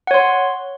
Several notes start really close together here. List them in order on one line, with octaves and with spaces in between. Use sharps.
F#5 C#5 C6